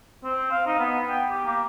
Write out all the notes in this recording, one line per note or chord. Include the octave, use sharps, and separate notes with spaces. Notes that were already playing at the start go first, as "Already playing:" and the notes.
C4
F5
D#4
B3
G5
G4
A#3